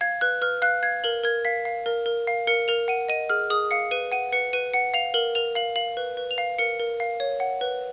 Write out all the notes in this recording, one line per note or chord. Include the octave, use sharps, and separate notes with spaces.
F5 G#6
B4 F#6
B4 F6
F5 F#6
F5 G#6
A#4 F#7
A#4 G#6
F5 B6
F5
A#4
A#4
F5
A#4 C#7
A#4 F7
F#5 D#7
D#5 D#7
G#4 F6
G#4 D#6
F5 C#7
B4 D#7
F#5 D#7
B4 C#7
B4 D#7
F#5 C#7
F5 F7
A#4 F#7
A#4 F7
F5 F#7
F5 F#7
B4
B4
F7
F5
A#4 C#7
A#4
F5
C#5
F#5
B4